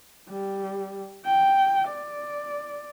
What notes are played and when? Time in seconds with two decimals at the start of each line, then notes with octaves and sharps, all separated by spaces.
0.29 G3
1.25 G5
1.88 D5